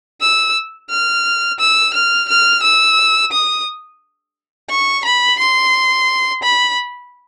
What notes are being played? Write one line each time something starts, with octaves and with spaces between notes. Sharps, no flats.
E6
F6
E6
F6
F6
E6
D#6
C#6
B5
C6
B5